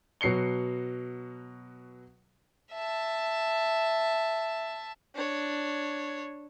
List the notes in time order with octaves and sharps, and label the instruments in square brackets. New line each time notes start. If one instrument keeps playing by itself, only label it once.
[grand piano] B2 F#3 C7 C#7 G7
[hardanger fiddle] E5 A5
[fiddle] D4 C#5